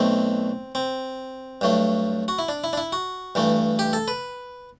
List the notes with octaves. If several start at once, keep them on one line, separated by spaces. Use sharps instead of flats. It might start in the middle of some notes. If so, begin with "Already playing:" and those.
Already playing: B1 B2 A3 C4
C4
G2 F#3 A3
F#4
E4
D4
E4
D4
E4
F#4
G2 E3 A3
G4
A4
B4